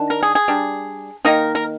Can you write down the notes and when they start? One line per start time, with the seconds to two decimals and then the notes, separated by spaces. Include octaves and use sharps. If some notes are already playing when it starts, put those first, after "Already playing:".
Already playing: D#3 D4
0.10 A#4
0.23 G#4
0.35 G#4
0.48 G3 D4
1.25 D#3 A#3 D#4 A#4
1.55 A#4